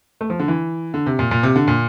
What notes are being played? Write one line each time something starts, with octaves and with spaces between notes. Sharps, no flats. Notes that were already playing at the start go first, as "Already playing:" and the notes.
A3
F3
D3
E3
D3
C3
A#2
A#2
C3
D3
A#2